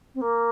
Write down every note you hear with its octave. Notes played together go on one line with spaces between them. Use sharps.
C4
A#3